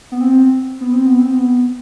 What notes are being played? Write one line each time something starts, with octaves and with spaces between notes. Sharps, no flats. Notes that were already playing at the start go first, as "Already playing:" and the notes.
B3
C4
B3
C4
B3
C4
B3